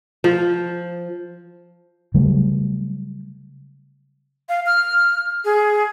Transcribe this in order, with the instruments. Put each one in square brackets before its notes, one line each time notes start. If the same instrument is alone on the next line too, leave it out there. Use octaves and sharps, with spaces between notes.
[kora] F3
[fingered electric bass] C#3 F#3 G3 A3
[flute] F5
F6
G#4